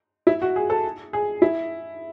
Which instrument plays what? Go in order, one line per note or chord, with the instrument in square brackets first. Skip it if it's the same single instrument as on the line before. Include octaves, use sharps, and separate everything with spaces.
[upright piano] E4
F#4
G#4
A4
G#4
E4